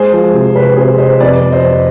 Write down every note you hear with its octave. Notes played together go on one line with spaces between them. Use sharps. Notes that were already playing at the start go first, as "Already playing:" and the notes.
Already playing: G#3 G#4 C5
F3
C3
C3 B4
C3 G#4 C5
C3 C5 D#5
F2 B4 D5
F2
C5 D#5
F2